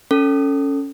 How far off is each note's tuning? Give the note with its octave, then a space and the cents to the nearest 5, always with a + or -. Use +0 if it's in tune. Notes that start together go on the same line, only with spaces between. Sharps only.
C#4 +0 A4 +15